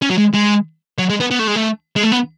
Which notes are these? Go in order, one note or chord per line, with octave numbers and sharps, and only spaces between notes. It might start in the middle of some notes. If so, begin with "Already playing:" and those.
C#4
F#3
G#3
G#3
F#3
G#3
B3
B3
A3
G#3
A3
G#3
A3
B3